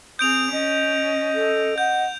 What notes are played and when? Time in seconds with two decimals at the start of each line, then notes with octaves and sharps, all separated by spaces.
0.19 C4 G#4 D#6 G6 D7 F7
0.52 C#4 D#5
1.35 A4
1.78 F#5 G6